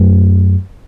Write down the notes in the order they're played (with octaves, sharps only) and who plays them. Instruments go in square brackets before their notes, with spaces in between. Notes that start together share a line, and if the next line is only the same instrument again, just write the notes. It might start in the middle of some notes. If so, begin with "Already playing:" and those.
Already playing: [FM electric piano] F#2 F#3 A3